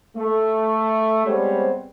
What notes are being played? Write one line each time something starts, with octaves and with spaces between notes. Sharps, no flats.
A3
G3 G#3 B3 C4 C5 C#5